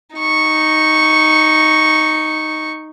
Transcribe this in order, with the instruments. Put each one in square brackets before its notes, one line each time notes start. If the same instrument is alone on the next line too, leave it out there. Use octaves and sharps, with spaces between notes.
[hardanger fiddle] D#4 C#6